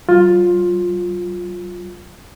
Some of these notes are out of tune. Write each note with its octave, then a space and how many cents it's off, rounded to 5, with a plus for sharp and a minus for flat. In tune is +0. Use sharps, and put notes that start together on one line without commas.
F#3 +35 F4 +15